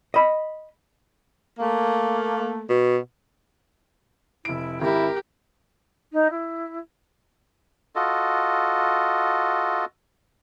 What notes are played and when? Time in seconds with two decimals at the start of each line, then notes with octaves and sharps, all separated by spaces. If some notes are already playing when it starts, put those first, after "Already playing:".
0.14 D#5 B5
1.59 A3 A#3
2.70 B2
4.45 F1 E4 D7
4.82 G#1 E4 G4 A#4
6.12 D#4
6.30 E4
7.96 F4 F#4 A4 D#5